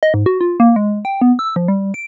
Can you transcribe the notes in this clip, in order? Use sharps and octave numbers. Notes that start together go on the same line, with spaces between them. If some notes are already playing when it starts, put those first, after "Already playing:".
D#5
G#2
F#4
F4
A#3
G#3
G5
B3
E6
F3
G3
D7